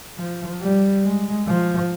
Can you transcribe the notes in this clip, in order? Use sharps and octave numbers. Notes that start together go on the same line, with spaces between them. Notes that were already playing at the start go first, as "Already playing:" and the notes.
F3
G3
G#3
F3